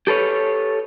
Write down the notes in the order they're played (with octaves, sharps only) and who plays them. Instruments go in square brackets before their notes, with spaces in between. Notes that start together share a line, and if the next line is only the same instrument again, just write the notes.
[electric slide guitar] G4 A4 B4 C#5